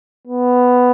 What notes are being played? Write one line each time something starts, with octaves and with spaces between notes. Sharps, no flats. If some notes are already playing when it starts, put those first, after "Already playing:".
B3